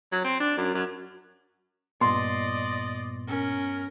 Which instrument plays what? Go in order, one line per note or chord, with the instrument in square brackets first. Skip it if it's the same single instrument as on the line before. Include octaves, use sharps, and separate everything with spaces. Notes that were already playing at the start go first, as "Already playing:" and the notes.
[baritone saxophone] F#3
C4
D4
F#2
F#2
[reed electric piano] G2 B3 [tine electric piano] A#2 [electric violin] D5 D#5 [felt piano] C6
[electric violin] C#4 A#4